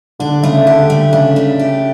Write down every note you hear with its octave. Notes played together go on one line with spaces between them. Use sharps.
D3 D4
C#3 A3
D3 G4
D3 A3
C#3 D4
A3
G4